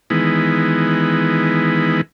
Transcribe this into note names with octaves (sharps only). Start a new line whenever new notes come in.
D#3 E3 G#3 B3